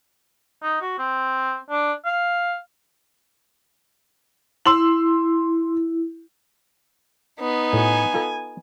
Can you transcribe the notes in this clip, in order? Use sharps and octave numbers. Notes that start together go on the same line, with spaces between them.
D#4
F#4
C4
D4
F5
E4 C6 E6 F#7
B3 D#4
A2 F#4 G#5
F4 A4